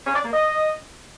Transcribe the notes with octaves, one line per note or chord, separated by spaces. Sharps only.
C#4
D5
A#3
D#5